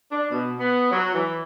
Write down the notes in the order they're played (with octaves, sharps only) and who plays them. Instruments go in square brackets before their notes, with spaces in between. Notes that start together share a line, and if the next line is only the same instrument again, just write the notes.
[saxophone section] D4
B2
B3
F#3
E3